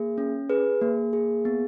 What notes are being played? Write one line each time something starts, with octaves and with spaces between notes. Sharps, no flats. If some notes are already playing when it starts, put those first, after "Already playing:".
Already playing: A#3 G#4
C#4
G#4 B4
A#3
G#4
B3